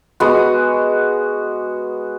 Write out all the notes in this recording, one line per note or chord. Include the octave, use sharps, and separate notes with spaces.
G#3 B3 F#4